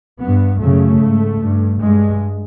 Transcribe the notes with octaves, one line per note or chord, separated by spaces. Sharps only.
G2 B3
F#2 C#3 A3
G#2
G2
G2 G#3